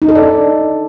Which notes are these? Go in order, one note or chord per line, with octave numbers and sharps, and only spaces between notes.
D#4
A4
D5
D4